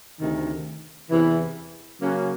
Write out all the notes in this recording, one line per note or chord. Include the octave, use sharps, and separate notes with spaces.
D2 C3 D#3
E2 C3 E3
C#3 F#3 A#3 C#4 F#4